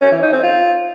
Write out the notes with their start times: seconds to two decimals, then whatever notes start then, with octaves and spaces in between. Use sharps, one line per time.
0.01 C#4
0.12 E3
0.22 D#4
0.33 C4
0.43 F4